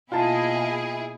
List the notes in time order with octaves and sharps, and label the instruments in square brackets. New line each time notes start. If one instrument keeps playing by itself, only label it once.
[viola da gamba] B2 A#3 D#5 [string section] E4 G#4 [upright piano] F4 A5